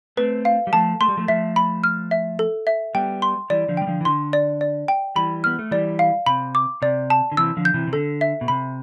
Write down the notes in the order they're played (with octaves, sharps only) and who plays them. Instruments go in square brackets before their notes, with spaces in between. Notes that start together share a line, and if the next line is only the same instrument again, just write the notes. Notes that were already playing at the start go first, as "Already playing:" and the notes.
[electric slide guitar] A3 C4 [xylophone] B4
[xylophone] F5
[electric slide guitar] G3
[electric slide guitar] F3 A3 [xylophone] A5
[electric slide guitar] A3 [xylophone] C6
[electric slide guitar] G3
F3 A3
[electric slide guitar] F3 A3 [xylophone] E5
[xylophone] B5
F6
E5
A4
E5
[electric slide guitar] G3 B3 [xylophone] G5
[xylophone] C6
[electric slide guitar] E3 G3 [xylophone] D5
[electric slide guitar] D3 F3
[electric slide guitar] G3 [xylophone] G5
[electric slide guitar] D3 F3
E3
[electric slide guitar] D3 [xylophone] C6
[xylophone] D5
D5
G5
[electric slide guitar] E3 G3 [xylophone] B5
[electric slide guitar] B3 [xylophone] F6
[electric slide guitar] A3
[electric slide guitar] E3 G3 [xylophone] D5
[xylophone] F5
[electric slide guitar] C3 [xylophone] B5
[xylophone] D6
[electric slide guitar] C3 [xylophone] D5
[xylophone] A5
[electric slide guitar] D3
[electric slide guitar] C3 E3 [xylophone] E6
[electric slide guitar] D3 F3
[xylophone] G6
[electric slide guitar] C3 E3
C3
[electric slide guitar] D3 [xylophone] A4
[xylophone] E5
[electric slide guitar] B2
[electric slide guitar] C3 [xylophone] B5